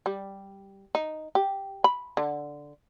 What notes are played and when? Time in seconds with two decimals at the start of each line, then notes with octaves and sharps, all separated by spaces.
0.06 G3
0.95 D#4
1.35 G4
1.84 B5
2.17 D3